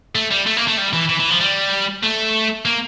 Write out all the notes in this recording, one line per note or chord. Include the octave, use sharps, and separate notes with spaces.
A3
G3
A3
A#3
A3
G3
E3
E3
E3
F3
G3
A3
A#3